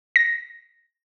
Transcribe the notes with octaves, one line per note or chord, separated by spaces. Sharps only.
A#6